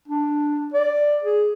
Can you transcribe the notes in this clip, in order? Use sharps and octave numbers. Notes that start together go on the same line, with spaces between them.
D4
D5
G#4